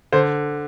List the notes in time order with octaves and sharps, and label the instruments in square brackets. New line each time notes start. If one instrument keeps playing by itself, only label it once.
[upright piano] D3 C5